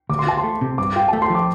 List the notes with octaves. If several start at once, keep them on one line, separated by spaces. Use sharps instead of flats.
D2 D6
C6
F4 A5
C6
A3
C3
G2 D6
F4 G5
A3 A5
C6
F3 D6